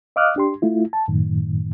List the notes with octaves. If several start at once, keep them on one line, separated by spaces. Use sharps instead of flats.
D#5 F5 D6 D#6 F6 F#6
D4 G4 C6
A3 E4 F4
A5
F#2 A2 D#3